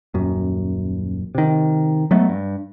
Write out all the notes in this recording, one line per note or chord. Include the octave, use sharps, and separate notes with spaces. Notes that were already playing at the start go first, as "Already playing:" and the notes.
D#1 F#2
C3 D#3
F#3 G#3 A3 B3
G2